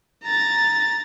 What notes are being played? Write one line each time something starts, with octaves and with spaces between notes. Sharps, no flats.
A#5 A6